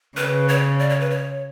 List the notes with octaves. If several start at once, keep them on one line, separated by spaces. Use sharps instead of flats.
C#3 B4
C#5
D5
C#5
B4
C#5